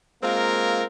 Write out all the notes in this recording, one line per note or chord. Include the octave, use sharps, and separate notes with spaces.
G#3 A#3 C4 F4 A#4